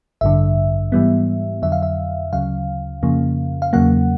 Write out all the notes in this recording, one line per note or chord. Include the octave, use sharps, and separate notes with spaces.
A1 G2 D3 E5
G#2 E3 G3 B3
F2 D3 F#3 E5
F5
E5
D2 C#3 F#3 F5
F2 C#3 F3 A#3
F5
E2 C#3 F#3 A#3 F#5